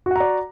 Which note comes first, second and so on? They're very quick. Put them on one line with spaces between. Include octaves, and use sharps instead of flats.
F#4 F#5 A#5 D5